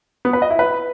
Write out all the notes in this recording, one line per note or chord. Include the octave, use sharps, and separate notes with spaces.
B3
B4
D#5
E4
B4